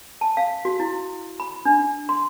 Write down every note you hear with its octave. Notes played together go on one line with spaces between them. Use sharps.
A5
F5
F#4
E4
B5
D4
C6